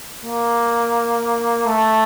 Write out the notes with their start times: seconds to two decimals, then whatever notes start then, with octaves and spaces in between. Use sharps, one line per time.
0.24 A#3
1.66 A3